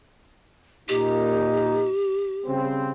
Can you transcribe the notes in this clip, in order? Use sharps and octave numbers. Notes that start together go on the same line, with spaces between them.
A#2 D#4 G4
C#3 G3 C4